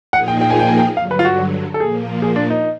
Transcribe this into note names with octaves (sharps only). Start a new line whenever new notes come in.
A#2 F3 A#3 D#4 G#4 F#5
G5
G5
G#5
G5
G#5
G5
G2 D3 F#3 F5
B4
F4
F#4
A4
A#2 F3 A#3 G#4
G#4
D4
D#4